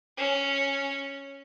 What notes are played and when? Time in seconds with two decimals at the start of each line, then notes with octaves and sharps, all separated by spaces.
0.17 C#4